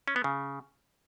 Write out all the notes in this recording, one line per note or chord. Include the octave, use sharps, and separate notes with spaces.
C#4
B3
C#3